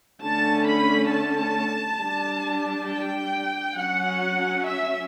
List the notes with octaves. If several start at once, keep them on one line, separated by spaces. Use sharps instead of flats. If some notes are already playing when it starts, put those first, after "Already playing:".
D3 A3 C#4 A5
B5
A5
G3 D4
G5
F#3 C#4 F#5
E5